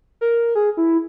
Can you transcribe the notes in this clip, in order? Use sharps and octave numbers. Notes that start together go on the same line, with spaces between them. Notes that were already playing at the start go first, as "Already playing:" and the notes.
A#4
G#4
E4